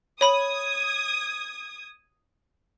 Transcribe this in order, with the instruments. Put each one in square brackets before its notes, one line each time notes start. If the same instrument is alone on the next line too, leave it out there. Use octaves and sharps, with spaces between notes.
[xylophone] C#5 B5 F#7 [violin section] D#6 G#6